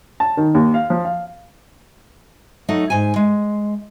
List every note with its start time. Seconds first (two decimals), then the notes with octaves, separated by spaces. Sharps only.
0.20 A5
0.37 D#3
0.55 D#2
0.74 F5
0.90 F3
1.05 F5
2.69 F#3 A3 D#4
2.90 G#2 G#5
3.16 G#3